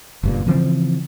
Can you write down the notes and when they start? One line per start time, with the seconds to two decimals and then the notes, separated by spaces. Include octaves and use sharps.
0.23 F#1 G2 A#2
0.47 C#3 E3 F3 C4